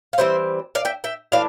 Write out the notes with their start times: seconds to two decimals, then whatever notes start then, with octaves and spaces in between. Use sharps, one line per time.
0.13 F5
0.18 E3 G3 C4 C5 E5
0.75 D5 F5
0.85 E5 G5
1.04 E5 G5
1.32 E3 A3 D4 D5 F5